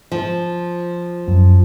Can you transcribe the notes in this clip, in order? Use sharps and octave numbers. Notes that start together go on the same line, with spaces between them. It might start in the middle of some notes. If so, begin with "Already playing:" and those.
F3
F#2